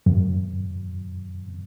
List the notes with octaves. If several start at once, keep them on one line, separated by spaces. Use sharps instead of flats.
F#2